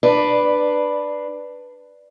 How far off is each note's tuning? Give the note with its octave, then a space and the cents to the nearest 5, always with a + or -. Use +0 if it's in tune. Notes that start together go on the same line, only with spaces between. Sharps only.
D4 +20 B4 +0 D5 +0